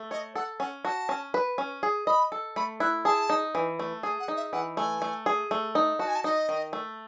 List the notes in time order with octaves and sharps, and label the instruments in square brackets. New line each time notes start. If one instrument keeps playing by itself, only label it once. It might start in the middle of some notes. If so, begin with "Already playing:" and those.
Already playing: [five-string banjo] A3
[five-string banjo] C#5 [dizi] D#5
[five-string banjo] A4 [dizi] F#5
[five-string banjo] C#4 [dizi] F#5
[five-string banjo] F#4 [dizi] A5
[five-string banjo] C#4
B4
C#4
G#4
[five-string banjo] D#5 [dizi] B5
[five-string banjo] A4
[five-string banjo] A3 [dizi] B5
[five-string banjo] E4 [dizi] F#6
[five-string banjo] G#4 [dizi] A5
[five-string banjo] D#4
E3
A3
[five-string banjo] G#4 [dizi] G#5
[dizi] F#5
[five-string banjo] D#4
[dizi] E5
[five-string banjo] E3 [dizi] F#5
[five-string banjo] A3 [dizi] G#5
[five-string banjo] A3
G#4
A3
D#4
[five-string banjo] F#4 [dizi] A5
[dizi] G#5
A5
[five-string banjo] D#4 [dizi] D#5
[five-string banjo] D#3
A3